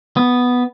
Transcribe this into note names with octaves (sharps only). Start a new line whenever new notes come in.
B3